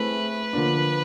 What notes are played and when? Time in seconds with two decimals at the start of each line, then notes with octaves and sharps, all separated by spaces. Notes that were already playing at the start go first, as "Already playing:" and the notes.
Already playing: A3 C4 E4 G#4 B4
0.53 D3 F3 A#3 D4